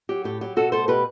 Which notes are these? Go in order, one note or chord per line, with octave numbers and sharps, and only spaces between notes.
F#3 G4
A2 G4
F#3 G4
B2 F#4 A4
A3 A4 C5
B2 G4 B4